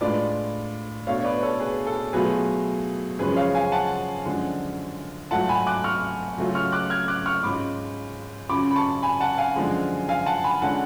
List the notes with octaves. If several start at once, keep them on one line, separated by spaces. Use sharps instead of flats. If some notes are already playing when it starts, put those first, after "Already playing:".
A2 G#3 D4 F4 B4 D5
B2 A3 D4 C#5 F5
C#5
B4 D5
B4
A4 C#5
G#4 B4
A4
B2 F#3 A3 F4 G#4 B4
F#2 C#3 F3 G#3 C#4 G#4 B4
C#5 F5
F5 G#5
F#5 A5
F#2 D3 F3 G#3
G#2 F#3 A3 F4 F#5 A5
G#5 B5
D6 F#6
C#6 F6
C#3 F#3 A3 C#4 F4
C#6 F6
D6 F#6
F6 G#6
D6 F#6
C#6 F6
G#2 G#3 C#4 F4 B5 D6
F#2 C#3 F#3 C#4 F4 B5 D6
B5
A5 C#6
G#5 B5
F#5 A5
F5 G#5
F#2 D3 F3 G#3
F5 G#5
F#5 A5
G#5 B5
D3 G#3 C#4 F4 F#5 A5